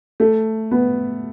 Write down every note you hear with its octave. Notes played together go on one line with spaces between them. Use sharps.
A3
B3